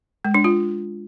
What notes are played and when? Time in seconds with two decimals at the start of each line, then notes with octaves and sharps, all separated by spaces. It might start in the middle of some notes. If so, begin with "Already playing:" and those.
0.25 G#3
0.34 D4
0.44 F4